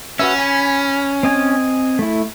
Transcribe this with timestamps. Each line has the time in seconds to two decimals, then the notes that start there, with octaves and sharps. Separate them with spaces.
0.19 C#4 F#4 B4 E5
0.38 G#5 B5
1.23 C4 D#5 G#5
1.99 A3 E4